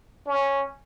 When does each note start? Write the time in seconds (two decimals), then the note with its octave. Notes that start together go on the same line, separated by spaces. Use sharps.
0.27 C#4